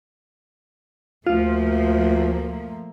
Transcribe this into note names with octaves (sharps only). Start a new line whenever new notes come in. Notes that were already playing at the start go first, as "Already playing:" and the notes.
D2 F3 A3 A#3 F4